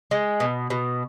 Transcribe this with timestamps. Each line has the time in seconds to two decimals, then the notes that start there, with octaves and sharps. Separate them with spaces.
0.11 G#3
0.40 B2
0.70 B2